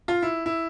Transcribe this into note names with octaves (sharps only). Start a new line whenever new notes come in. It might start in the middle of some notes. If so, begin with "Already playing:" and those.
F4
E4
E4